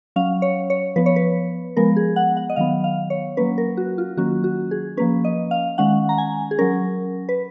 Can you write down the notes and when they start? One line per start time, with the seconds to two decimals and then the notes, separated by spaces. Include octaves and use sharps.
0.16 F#3 C#4 F5
0.42 C#5
0.70 C#5
0.96 F3 B3 B4
1.06 C#5
1.16 B4
1.77 F3 G#3 B3 A#4
1.97 G#4
2.16 F#5
2.37 F#5
2.50 D#5
2.56 D#3 F#3 B3 F5
2.84 F5
3.10 C#5
3.37 F#3 A#3 C#4 B4
3.58 A#4
3.77 F#4
3.98 F4
4.17 D#3 F#3 A#3 C#4 F#4
4.44 F#4
4.71 G#4
4.97 F3 A#3 C#4 B4
5.25 D#5
5.51 F5
5.78 D#3 G#3 C#4 F#5
6.09 A#5
6.18 G#5
6.51 G#4
6.59 F#3 C#4 A#4
7.29 B4